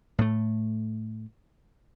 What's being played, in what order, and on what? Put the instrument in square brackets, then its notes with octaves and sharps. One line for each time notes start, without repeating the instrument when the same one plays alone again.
[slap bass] A2 A3